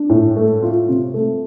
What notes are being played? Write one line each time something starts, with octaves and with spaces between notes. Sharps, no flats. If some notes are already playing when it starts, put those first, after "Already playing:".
Already playing: D4
A2
A3
F4
C3
A3